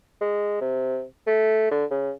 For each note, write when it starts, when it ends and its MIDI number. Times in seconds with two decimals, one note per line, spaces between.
0.21 0.58 56
0.61 1.03 48
1.27 1.71 57
1.71 1.85 50
1.91 2.12 49